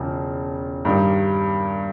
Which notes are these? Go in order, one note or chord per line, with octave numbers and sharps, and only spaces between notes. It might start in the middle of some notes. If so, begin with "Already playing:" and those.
Already playing: E1 C#3 F3
G2 D#3 G3